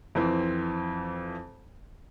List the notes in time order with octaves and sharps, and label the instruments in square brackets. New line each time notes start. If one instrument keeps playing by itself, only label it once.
[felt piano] F2 E3 C4